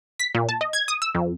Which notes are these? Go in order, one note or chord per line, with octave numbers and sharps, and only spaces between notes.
B6
A#2
A5
D#5
G#6
D#6
E6
F2